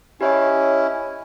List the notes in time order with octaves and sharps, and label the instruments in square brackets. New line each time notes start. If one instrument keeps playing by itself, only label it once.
[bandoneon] C#4 E4 [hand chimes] G4 C#5 D#5